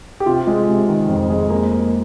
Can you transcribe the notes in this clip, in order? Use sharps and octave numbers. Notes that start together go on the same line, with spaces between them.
G4
C3 F4
G#3
C3
D#3
F2
G#3
A#3
A#3